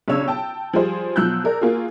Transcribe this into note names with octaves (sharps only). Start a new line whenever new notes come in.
B1 C#3 D4 C#5 E6
G5 A5
F3 G3 G#4 C5
B2 F3 F#3 E6 F#6 G6
G#4 A#4 D5
A#3 F4 F#4 G#4